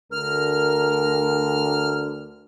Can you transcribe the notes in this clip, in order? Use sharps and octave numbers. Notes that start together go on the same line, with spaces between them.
D2 A#4 F6